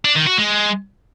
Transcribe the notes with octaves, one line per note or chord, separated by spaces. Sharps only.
D4
D#3
F#4
G#3